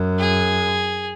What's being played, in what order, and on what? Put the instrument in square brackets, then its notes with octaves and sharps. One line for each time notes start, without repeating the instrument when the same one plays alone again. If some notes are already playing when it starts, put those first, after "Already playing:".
Already playing: [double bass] F#2
[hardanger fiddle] G#4